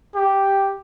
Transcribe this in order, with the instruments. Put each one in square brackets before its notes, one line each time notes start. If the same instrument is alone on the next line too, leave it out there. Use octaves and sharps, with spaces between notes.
[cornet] G4